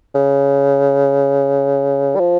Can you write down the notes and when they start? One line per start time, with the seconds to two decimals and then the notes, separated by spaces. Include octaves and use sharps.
0.14 C#3
2.16 G3
2.20 F3